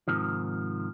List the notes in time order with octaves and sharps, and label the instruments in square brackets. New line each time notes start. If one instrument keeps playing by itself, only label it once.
[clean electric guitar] G#2 C3 D#3 F3